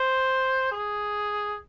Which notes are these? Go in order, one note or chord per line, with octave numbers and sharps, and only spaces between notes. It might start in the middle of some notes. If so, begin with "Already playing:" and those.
Already playing: C5
G#4